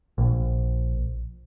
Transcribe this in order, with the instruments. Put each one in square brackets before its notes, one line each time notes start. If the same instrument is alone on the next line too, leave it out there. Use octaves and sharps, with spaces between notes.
[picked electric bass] A#1